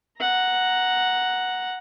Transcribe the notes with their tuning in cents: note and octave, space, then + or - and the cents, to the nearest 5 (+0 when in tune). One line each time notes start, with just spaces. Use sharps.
F#5 +0 A#5 +5